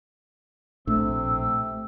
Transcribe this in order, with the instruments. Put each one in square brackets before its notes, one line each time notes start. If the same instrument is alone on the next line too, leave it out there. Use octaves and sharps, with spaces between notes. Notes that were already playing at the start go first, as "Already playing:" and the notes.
[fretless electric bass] A#1 A2 D4 [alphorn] C3 [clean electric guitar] A3 [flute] E6